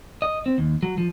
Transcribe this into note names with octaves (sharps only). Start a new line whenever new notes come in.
D#5
C4
D#2
F#3
F3